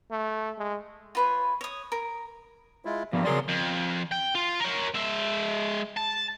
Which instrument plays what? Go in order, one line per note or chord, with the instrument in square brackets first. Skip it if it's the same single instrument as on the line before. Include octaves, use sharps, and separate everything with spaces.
[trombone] A3
G#3
[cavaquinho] F4 B4 C#5
C#5 D#6
A#4
[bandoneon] G#3 E4 F4
[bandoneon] G2 G3 A#3 [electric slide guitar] F3 B3
[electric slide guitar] C#3 A#4 D5 [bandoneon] F#3 G#4 C6
[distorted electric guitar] F2
G5
F4
A#4 C#5
G#3 E5
A5